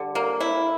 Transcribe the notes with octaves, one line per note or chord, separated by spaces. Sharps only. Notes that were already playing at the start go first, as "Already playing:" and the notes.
Already playing: D3 G3
A#3
E4